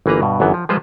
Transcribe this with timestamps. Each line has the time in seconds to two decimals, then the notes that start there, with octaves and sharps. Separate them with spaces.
0.06 G1 E3 A#3 B4 A#5
0.22 G2 B2
0.40 G1 F#2 E3 B3
0.54 F3
0.69 F3 G3 G#3 F4 B4 C5